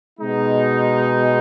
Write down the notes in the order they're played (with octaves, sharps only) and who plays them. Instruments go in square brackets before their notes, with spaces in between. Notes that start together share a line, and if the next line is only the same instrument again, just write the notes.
[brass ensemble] B2 G#3 D#4